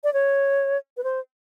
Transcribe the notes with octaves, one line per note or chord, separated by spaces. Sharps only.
D5
C#5
B4
C5